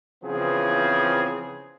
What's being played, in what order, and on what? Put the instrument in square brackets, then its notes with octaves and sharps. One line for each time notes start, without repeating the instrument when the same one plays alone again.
[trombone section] C#3 E3 F3 B3 C4 G#4